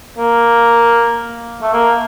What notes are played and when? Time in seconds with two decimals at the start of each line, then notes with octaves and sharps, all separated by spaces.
0.18 A#3
1.62 A3
1.73 A#3